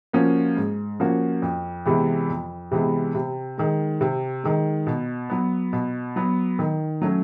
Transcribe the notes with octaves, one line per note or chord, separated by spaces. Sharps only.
F3 A#3 C#4 F#4
G#2
F3 A#3 C#4 F#4
F2
C3 E3 G#3 B3
F2
C3 E3 G#3 B3
C3
D#3 G#3
C3
D#3 G#3
B2
F#3 B3
B2
F#3 B3
D#3
F#3 A3 C#4